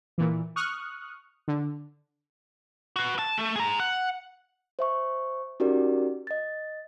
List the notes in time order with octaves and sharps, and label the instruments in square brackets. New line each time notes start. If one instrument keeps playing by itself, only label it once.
[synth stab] A#2 E3
C#6 D#6 F6 F#6
D3
[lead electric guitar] F#4 B4
A5
A3
G#4 A#5
F#5
[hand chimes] C5 E5 C#6
C#4 D#4 F#4 G4 A#4 D5
D#5 A6